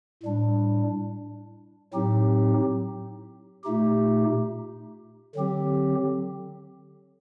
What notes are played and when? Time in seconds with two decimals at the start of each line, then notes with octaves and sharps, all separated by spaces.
0.23 A2 G3 D4
1.94 A2 F#3 C4 D#4 G4
3.64 A#2 A3 D#4 G4
5.35 D3 F#3 C4 G4